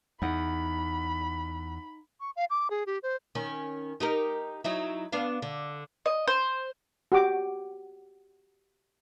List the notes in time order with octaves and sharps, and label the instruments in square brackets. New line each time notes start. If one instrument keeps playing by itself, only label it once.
[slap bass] E2 [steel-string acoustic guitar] D#4 F#5 [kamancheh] B5
[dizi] C#6
F5
D6
G#4
G4
C5
[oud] D#3 C#4
D#4 G4 A#4
F#3 D#4 E4
B3 D4 F5
D3
[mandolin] D#5
C5
[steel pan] F#4 G4 D6